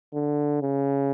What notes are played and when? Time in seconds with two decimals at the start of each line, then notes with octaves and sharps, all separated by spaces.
0.14 D3
0.62 C#3